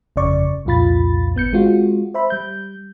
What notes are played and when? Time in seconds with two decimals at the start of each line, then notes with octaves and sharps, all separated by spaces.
0.16 G1 F2 C#3 D5 C#6
0.65 C2 F2 A#2 F4 B5 A6
1.35 G#1 B3 G6 C#7
1.53 G#3 C4 F4 F#4
2.14 C5 E5 B5
2.30 G3 G6